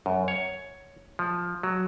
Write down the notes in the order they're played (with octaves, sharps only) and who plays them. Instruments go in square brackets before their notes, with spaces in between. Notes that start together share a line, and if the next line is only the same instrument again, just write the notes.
[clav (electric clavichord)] F#2
C#5
F3
F#3